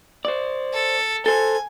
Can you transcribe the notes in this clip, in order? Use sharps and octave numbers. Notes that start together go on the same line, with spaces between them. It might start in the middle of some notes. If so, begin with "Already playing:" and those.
C5 D5
A4
A4 C5 G#5